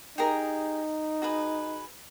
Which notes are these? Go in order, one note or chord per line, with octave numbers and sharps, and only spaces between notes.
D#4 G4 G#4 A#4
F#4 G#4 B4